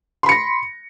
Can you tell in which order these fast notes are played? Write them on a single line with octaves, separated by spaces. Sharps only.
C6 B5 C#7 A#6